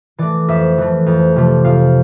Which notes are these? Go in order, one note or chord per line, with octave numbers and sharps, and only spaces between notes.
E3 A3 D5
F2 E5
E3 A3
F2
C3 F3 A3
F2 F5